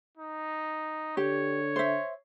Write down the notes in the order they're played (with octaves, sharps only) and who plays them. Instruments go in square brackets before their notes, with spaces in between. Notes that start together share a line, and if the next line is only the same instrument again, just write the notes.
[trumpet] D#4
[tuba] D3 [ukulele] G4 [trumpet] C#5
[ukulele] C5 E5